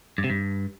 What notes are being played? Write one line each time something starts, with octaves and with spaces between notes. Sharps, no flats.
G2
C3
G2